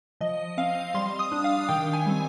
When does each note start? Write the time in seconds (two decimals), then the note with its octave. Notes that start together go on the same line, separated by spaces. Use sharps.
0.21 F3 D#5
0.58 C4 F5
0.94 G3 C6
1.19 D#6
1.32 D4
1.44 F5
1.69 D#3 G5
1.93 G#5
2.06 G3 C4